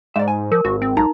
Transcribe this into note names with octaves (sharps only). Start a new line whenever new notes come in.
G#2 D5 E5
G#5
F3 A#4
G#1 F#4
C4
B1 D#4 A#5